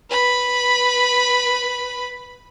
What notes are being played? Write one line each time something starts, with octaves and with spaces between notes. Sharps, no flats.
B4 B5